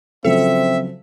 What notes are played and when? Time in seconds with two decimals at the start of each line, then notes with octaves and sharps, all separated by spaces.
0.25 C#3 F3 F#3 C4 A4 E5